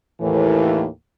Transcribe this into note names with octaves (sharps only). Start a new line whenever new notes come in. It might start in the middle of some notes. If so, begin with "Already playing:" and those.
D#2 A2 E3